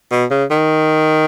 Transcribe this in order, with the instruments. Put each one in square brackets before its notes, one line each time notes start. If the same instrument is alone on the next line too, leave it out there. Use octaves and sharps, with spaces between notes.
[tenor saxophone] B2
C#3
D#3